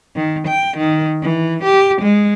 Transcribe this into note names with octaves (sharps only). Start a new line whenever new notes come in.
D#3
G5
D#3
E3
G4
G#3